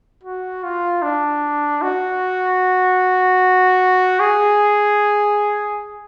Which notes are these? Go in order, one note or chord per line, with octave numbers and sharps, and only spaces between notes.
F#4
F4
D4
F#4
G#4